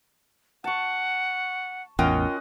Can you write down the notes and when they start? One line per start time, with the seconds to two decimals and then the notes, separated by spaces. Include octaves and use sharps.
0.64 F#5 A5 C#6
1.99 A1 E2 C#4 F4 A#4 D#5 F#5 G5